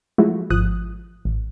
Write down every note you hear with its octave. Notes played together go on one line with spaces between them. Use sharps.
F3 F#3 G#3 A3 E4 F#4
G#1 F3 D#6 F#6
A1